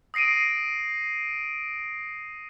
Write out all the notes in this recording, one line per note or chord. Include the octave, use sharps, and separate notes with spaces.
D#6 A#6 C7 D7 D#7